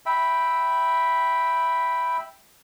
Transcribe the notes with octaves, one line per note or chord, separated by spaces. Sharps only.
E5 G5 B5